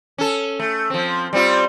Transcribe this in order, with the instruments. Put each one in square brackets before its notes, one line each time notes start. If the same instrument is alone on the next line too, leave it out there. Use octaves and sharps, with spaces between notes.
[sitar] C#4 A4
A3
F3 C4
G3 C4 F4